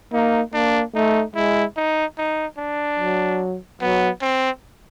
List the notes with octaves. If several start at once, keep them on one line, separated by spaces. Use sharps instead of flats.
A#3 D#4
A#3 D4
A3 D#4
G#3 E4
D#4
D#4
D4
F#3
F#3 B3
C4